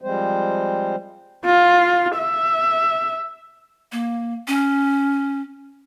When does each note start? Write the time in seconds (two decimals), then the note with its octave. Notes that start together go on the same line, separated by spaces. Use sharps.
0.02 F3 G3 G#3 C4 C5
1.45 F4
2.18 E5
3.92 A#3
4.47 C#4